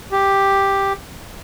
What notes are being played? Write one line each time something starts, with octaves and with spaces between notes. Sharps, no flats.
G4